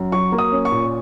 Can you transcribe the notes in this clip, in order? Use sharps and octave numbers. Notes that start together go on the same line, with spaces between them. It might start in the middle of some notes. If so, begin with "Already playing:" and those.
Already playing: F#2
F#3 C#6
A#3
D#6
C#4
C#6
A#2